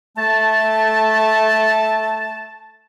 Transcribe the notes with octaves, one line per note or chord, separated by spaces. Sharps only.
A3 A5